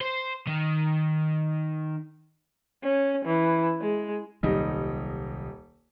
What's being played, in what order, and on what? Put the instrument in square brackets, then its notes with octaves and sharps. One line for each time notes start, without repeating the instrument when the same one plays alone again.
[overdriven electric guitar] C5
D#3
[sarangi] C#4
E3
G#3
[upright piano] D#1 G3 D#4 [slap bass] C2 D#3 F#3